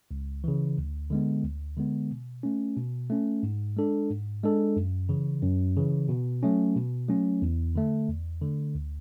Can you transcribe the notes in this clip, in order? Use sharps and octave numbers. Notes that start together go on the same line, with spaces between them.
C#2
C#3 E3
D2
D3 G#3 B3
D2
D3 G#3 B3
B2
A3 C#4
B2
A3 C#4
G#2
G#3 D4 A4
G#2
G#3 D4 A4
F#2
C#3 E3
F#2
C#3 E3
B2
F#3 A3 C#4
B2
F#3 A3 C#4
E2
D3 A3
E2
D3 A3
D2